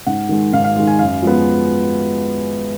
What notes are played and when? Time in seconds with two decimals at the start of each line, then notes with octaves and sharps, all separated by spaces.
0.06 G#2 F#5
0.29 D#3 G#3
0.53 G#2 F5
0.64 F5
0.76 D#3 G#3
0.87 G#5
0.99 F#2 F5
1.22 F3 G#3 B3